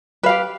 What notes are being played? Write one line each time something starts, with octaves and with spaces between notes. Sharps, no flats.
G4 B4 F5